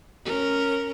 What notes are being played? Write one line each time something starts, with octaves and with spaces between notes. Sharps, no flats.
C#4 A#4